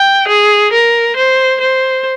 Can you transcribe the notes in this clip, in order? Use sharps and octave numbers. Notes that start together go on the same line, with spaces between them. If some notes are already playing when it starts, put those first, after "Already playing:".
Already playing: G5
G#4
A#4
C5
C5